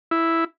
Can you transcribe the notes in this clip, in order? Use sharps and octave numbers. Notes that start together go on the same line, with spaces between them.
E4